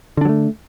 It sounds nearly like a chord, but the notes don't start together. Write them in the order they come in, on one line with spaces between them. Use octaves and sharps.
D3 D4 F#3 A3